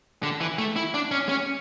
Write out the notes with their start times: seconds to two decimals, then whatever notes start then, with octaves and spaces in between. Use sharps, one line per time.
0.23 D3
0.41 E3
0.58 A3
0.76 E4
0.94 D4
1.11 C#4
1.29 C#4